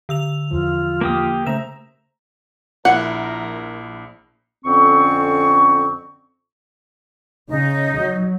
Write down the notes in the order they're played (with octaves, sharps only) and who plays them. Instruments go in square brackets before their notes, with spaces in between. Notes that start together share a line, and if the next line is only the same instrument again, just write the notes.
[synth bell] D3 E6 F7
[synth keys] E2 F3 [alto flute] F4
[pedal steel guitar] A#3 G4 D#6
[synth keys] C#3 A3 [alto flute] C5 [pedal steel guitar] E5 A#5 [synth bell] E7
[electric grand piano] A#1 E4 [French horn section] A#4 [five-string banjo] F#5
[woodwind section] F2 D3 C4 C#4 C#6
[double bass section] C#3 [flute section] D#4
[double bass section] F#3